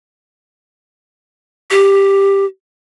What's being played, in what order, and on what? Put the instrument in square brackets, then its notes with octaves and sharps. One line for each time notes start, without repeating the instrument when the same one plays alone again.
[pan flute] G4